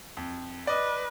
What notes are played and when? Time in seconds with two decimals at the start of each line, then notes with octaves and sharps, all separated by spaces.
0.17 F2
0.67 B4 D5 D#5